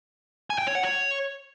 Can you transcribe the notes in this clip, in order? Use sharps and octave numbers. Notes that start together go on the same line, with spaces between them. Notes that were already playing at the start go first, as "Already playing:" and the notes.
G#5
G5
C#5
F#5
C#5